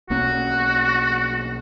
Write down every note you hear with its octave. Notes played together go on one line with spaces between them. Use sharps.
B1 A#3 C#4 F#4